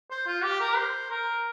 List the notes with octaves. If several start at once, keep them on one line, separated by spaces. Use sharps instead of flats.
C5
F4
G4
A#4
C5
A#4